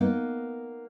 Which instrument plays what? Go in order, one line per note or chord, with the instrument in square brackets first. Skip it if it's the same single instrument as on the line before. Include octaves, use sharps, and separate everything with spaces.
[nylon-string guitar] A#3 B3 D#4